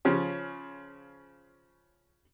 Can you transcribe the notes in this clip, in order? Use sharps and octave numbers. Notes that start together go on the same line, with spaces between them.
C#3 F3 C#4